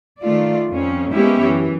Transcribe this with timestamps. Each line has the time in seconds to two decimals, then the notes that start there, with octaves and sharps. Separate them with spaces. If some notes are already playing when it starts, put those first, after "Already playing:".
0.21 D#3 A3 F4 D5
0.70 F2 C4 C#4
1.13 G#3 A#3 B3 C#4 E4 G4
1.43 F#2 E3